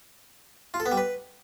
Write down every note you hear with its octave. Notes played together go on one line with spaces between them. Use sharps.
F4
A4
B3
G3
B4